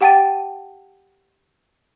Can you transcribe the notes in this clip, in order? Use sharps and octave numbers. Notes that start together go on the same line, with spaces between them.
G4 F#5 G5 A5 A6 D#7